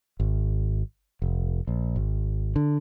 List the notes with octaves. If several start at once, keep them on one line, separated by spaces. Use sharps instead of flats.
G#1
F1
A#1
G#1
D3